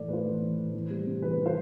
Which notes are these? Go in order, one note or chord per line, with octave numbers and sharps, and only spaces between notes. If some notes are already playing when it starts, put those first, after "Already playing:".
Already playing: A2 E3 A4 D5
A3 B4 C5
E3
E3
A2
E3
G3
C3
E3 B4
E3
C5